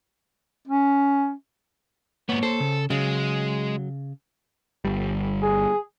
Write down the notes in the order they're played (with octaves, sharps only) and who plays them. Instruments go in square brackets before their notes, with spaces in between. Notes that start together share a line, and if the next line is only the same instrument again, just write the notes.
[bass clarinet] C#4
[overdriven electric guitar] G#2 B3 [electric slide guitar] A#3 C#5
[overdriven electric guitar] A4 [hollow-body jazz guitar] C5
[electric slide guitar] C#3
[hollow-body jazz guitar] C#3 [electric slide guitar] F#3 [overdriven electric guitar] G#3
[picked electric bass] G1 G3
[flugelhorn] G#4